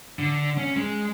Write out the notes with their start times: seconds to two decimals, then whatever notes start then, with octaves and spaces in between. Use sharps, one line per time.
0.19 D3
0.58 C#4
0.77 G#3